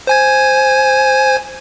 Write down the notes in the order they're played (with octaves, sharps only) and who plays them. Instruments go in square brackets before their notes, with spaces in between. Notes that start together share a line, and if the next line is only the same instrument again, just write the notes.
[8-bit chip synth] C5 G#5 G#6